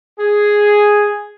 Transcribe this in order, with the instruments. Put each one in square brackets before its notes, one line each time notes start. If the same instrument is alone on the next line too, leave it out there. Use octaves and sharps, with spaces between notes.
[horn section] G#4